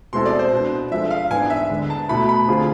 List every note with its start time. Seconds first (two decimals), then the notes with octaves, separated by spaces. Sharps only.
0.13 B2 G#3 C4 E4 A4 C6
0.25 D5
0.39 C5
0.52 B2 B3 D4
0.91 F3 G#3 D4 A4 E5
1.10 F5
1.30 G#2 E3 B3 D4 G#5
1.50 E5
1.70 D3 G#3 B3
1.90 A5
2.09 B2 A3 E4 B5
2.29 B5
2.48 D3 A3 C4 F4 G#4